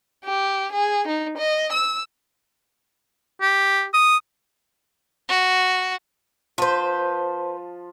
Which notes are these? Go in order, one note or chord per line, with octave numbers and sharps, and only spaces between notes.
G4
G#4
D#4
D#5
E6
G4
D#6
F#4
F3 B4 C5